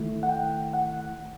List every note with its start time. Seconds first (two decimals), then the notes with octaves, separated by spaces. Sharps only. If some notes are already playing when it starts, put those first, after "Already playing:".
Already playing: D#3 A3 E4
0.23 F#5
0.29 G5
0.73 F#5